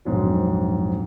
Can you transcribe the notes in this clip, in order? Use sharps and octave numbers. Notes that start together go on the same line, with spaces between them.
A#1 F2 G#2 F#3